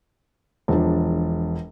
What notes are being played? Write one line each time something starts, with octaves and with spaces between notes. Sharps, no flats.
E1 E2 F3 D4